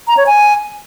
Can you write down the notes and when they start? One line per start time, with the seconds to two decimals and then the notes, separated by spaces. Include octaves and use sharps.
0.08 A#5
0.17 C#5
0.27 G#5